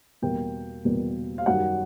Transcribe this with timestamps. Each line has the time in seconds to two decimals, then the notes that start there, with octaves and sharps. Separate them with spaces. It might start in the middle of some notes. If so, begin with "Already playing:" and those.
0.22 E2 B2 G3 A#3 G5
0.85 E2 B2 G3 A#3
1.38 F5
1.46 F#2 D#3 G3 F#5